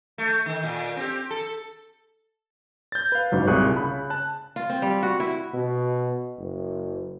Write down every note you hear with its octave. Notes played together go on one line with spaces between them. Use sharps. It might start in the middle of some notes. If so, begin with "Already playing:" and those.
A3
D#3
A#2
C4 G4
A4
G6 A6
B4 F5
G1 G#2 C#3 F#3
C2 A#2 G#4 C#6 F#6
C#3 B5
A5 F#6
F4
C4
G3
F#4
E4
B2
F#1